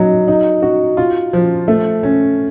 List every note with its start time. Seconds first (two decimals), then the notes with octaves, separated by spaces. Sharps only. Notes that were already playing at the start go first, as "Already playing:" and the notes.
Already playing: F#3 D#4
0.28 D#4
0.62 F#4
0.97 F4
1.33 F3
1.68 A3
2.03 C#4